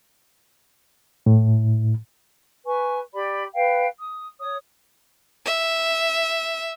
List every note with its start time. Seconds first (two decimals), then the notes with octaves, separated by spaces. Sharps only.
1.26 A2
2.65 B4 G#5 C#6
3.13 G4 D5 B5
3.53 B4 F5 G5
3.98 D#6
4.39 C#5 D#6
5.46 E5